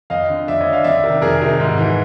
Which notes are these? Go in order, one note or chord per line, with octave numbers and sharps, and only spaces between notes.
F2 D#5 F5
D3
F2 D5 E5
C#5 D#5
D3
D#5 F5
F2 D5 E5
C3 D#3
F2 G#4 A#4
C3 D#3
G#2
E3